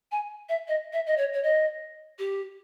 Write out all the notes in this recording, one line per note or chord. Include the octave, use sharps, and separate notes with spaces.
G#5
E5
D#5
E5
D#5
C#5
C#5
D#5
G4